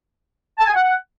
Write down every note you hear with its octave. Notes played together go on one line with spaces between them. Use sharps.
A5
G#5
F#5